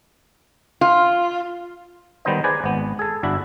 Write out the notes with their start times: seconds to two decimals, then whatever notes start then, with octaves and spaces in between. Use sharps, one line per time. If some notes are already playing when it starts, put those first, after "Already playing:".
0.81 F4
2.25 D#3 G3 B3 D#4 C5 D#5
2.44 G#4 B4 C5 D5 G#5 A#5
2.64 G#1 B3
2.99 G#4 A4
3.23 G1 D4 E4 F#4 E5